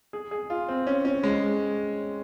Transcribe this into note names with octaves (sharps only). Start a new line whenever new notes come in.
G#4
G#4
F4
C4
C#4
C#4
G#3